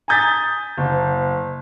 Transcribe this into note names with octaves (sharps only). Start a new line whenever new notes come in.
G#5 A#5 D#6 G6 A6 B6
F#1